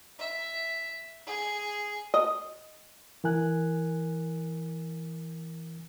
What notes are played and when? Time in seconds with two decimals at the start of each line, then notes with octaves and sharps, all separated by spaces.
0.19 E5
1.27 G#4
2.14 D#5
3.24 E3 A#4 G#5 F#6